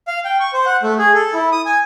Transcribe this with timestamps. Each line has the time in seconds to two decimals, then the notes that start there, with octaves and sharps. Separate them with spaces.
0.07 F5
0.25 G5
0.40 C#6
0.53 C5
0.66 F#5
0.83 A3
0.98 G#4
1.14 A4
1.34 E4
1.52 D#6
1.66 G#5